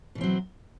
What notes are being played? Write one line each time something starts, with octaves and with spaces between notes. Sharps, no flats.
B2 E3 F#3 C4